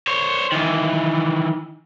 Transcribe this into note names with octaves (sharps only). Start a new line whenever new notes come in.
C5 C#5
D#3 E3